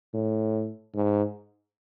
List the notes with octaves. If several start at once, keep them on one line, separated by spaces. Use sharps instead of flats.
A2
G#2